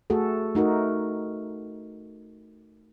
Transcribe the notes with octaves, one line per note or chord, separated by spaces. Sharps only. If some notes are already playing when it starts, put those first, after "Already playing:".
A3 F#4 G#4 A4
A3 D#4 F#4 A#4